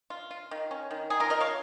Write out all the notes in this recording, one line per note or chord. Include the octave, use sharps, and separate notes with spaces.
F4
F4
D#3
C#4
D#3
D#4 G#4
F4 A#4
F3 A#4 D#5
C#5 F5